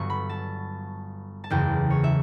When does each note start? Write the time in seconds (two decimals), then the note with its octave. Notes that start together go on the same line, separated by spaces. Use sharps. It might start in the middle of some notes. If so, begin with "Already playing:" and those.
Already playing: G1 G2 F#3 B3 C#6
0.10 B5
0.29 A5
1.44 A5
1.50 F#1 E2 C#3 G5
1.90 C#5
2.04 E5